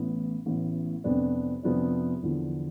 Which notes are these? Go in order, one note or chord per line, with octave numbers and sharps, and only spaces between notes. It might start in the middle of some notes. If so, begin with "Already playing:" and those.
Already playing: A1 A2 E3 B3
A1 A2 E3 B3
F2 C3 F3 B3 D4
F2 C3 F3 B3 D4
E2 D3 F3